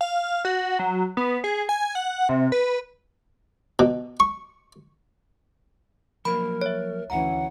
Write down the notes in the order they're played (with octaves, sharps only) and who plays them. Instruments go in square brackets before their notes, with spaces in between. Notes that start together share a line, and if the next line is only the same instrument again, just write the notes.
[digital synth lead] F5
F#4
F#3
B3
G#4
G#5
F#5
C3
B4
[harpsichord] B2
C#6
[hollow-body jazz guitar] F3 F#3 A#3 [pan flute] A#4 [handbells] B5
[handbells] C#5 E5
[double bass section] D2 E3 C#4 [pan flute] F#5 [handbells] A#5